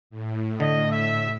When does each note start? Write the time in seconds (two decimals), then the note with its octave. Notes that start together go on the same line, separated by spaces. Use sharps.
0.10 A2
0.60 D3 D#5
0.92 E5